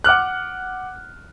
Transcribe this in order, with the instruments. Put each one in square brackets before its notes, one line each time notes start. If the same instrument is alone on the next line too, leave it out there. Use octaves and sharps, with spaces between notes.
[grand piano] F#5 D6 F6 F#6